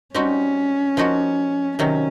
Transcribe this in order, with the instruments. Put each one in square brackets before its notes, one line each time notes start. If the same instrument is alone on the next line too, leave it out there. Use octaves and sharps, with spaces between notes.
[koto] G3 C4 D#4 F#4 [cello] C#4
[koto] F3 A#3 D#4 F#4
[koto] C3 D#3 F#3 [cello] C#4